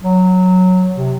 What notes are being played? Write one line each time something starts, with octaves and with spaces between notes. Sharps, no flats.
F#3
C3